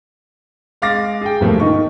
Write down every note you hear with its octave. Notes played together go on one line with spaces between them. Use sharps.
G#3 F5 D6 A6 A#6
G#4 G5
G2 B2 F3 A3 A#3
D#3 D#4 C#6